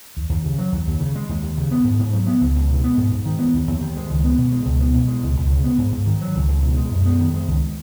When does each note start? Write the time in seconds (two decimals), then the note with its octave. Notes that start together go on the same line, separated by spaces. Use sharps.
0.17 D#2
0.30 D#2
0.45 C#3
0.58 F#3
0.72 D#2
0.87 D#2
1.00 C#3
1.15 G#3
1.29 D#2
1.42 D#2
1.57 C#3
1.71 B3
1.84 G#2
1.99 G#2
2.14 F#3
2.27 B3
2.41 C#2
2.55 C#2
2.69 B2
2.84 B3
2.98 G#2
3.11 G#2
3.26 D#3
3.39 B3
3.54 D#2
3.67 D#2
3.81 D#3
3.96 G#3
4.09 C#2
4.24 B3
4.38 B2
4.52 G#3
4.65 C#2
4.80 B3
4.94 B2
5.08 G#3
5.23 C#2
5.36 C#2
5.50 C#3
5.64 B3
5.78 G#2
5.92 G#2
6.06 D#3
6.21 F#3
6.35 C#2
6.48 C#2
6.63 B2
6.76 G#3
6.91 F#2
7.06 B3
7.20 D#3
7.34 G#3
7.48 C#2